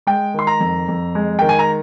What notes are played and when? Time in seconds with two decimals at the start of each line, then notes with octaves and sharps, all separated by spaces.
0.07 G#3 G5
0.34 D#3 C6
0.47 A#5
0.60 F2
0.88 F2
1.15 G#3
1.39 D#3 G5
1.49 G#5
1.59 A#5